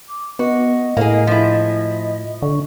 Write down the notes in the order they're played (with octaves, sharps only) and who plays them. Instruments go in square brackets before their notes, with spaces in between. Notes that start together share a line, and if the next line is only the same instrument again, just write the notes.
[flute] D6
[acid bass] B3 [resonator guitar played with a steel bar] F#4 [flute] D#5
[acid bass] A2 [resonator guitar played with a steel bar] A#3 G#4
[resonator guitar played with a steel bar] F3 E4
[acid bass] D3 [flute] C#6